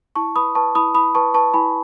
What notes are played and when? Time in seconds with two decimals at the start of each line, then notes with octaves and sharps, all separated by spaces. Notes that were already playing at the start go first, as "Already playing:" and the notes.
0.15 E4 A5 C#6
0.36 B4 B5 D#6
0.55 B4 A5 C#6
0.75 E4 B5 D#6
0.95 E4 B5 D#6
1.15 B4 A5 C#6
1.34 B4 A5 C#6
1.54 E4 G#5 B5